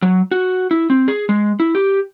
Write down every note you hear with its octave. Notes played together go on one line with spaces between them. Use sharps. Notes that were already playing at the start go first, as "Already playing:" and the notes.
F#3
F#4
E4
C4
G#4
G#3
E4
G4